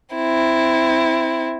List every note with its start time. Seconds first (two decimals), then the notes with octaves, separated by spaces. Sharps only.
0.16 C4 E4